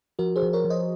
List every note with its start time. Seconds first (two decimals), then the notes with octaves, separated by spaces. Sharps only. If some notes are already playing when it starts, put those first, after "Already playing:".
0.19 F3 F#4 A#4
0.36 G#4 C5
0.43 F3
0.53 A#4 C#5
0.65 F3
0.70 C5 D#5